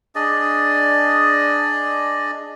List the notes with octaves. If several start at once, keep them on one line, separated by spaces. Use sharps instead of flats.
D4 G#4 D5 D#5